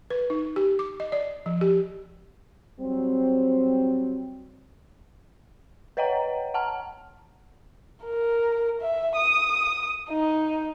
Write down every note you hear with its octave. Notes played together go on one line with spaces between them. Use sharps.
B4
D#4
G4
D6
D#5
D5
F3
G4
F#3 G3 C4
B4 C#5 D#5 F#5 G5 A#5
F#5 A5 A#5 F6
A#4
E5
D#6
D#4